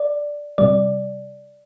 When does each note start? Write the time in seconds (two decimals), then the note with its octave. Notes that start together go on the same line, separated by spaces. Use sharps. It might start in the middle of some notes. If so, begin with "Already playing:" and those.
Already playing: D5
0.58 C3 G3 D5